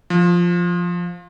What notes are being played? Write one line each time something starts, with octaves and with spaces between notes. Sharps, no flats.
F3